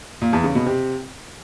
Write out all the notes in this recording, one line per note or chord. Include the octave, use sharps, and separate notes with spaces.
A#2
E2
C#3
B2
C3